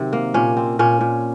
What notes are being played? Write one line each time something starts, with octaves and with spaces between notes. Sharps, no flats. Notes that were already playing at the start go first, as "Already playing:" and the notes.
Already playing: C3 D#3 F#3 C4
A#3
A#2 C#4
C4
A#2 C#4
A#2